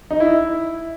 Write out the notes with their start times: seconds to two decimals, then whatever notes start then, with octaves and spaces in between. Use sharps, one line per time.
0.11 D#4
0.20 E4